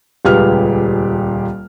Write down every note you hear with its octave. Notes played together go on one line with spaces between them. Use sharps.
D#1 C#2 G4 G#4 B4 F6